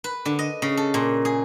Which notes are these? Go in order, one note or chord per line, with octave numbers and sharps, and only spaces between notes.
B4
D3
D#5
C#3
A4
A#2
G#4